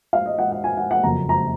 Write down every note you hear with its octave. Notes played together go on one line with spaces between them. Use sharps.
F5
D#5
F#5
F#5
G#5
F#5
F#5
F#1 F2 C#3 F#3 A#3 A#5
A#5